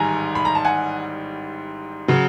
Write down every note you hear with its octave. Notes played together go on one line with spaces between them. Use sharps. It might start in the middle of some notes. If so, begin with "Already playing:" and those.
Already playing: A1 G#2 D#3 G3 G#5 A#5
B5
A#5
A5
F#5 G#5
C#3 F#3